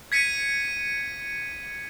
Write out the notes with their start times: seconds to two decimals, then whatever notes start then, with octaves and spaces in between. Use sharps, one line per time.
0.12 G#6 B6 C#7 D#7